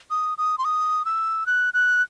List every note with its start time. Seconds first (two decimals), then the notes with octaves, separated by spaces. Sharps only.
0.10 D#6
0.38 D#6
0.58 C6
0.65 D#6
1.05 E6
1.46 F#6
1.74 F#6